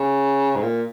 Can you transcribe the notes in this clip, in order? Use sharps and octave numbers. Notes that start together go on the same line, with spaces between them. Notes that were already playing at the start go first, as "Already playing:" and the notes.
Already playing: C#3
G#2
A#2